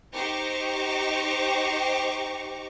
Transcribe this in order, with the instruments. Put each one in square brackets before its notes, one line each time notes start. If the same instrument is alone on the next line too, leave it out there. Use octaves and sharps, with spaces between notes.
[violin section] D#4 G4 C5 A#5 C#6 D6